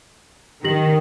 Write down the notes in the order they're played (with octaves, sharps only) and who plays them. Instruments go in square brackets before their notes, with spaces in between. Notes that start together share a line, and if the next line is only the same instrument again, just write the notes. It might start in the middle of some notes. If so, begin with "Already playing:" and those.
[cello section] D#3 [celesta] G4 A#6 F#7